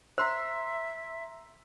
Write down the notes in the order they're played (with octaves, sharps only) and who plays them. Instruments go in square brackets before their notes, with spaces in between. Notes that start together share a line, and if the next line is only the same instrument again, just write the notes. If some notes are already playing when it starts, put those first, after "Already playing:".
[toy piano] C5 [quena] E5 [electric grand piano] A#5 C6 E6